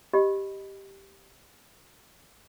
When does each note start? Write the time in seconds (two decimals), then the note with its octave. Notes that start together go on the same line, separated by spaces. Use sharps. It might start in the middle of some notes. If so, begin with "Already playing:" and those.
0.13 G4 D#5 B5